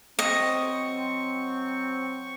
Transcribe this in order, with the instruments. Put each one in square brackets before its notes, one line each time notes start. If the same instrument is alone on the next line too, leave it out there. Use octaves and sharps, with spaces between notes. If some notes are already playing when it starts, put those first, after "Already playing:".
[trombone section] F#3 C4 [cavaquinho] D#5 [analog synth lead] C#6